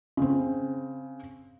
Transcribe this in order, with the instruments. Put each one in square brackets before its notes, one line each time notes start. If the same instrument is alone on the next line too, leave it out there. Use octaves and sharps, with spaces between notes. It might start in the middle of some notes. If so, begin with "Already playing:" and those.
[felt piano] C#3 C4